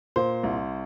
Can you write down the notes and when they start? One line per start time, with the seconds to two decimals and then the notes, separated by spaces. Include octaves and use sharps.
0.16 A#2 C5 C6
0.44 C2